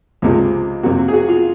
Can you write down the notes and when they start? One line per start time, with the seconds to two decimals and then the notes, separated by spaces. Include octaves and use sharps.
0.22 C#2 C3 F3 G#3 C4
0.83 F2 C3 F#3 A#3 F#4
1.08 G#4
1.13 F#4
1.28 F4